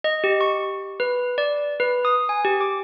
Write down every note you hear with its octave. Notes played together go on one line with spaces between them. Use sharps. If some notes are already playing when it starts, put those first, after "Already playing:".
D#5
G4
C#6
B4
D5
B4
D#6
G#5
G4
D6